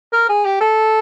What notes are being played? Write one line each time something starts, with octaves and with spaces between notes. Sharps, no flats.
A#4
G#4
G4
A4